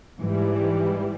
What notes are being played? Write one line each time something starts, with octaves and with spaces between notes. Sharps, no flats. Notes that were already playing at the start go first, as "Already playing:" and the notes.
G#2 E3 G3